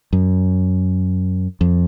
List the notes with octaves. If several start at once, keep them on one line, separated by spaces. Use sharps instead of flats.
F#2
F2